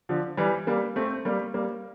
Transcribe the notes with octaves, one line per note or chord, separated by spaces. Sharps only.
D3 F3
E3 G3
G3 A#3
A3 C4
G3 A#3
G3 A#3